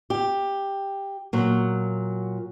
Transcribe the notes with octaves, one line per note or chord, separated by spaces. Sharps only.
G4
A#2 F#3